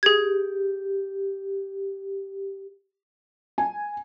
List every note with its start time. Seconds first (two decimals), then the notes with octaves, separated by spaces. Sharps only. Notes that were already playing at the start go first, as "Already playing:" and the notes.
0.03 G4 G#4 G#6
3.58 G#5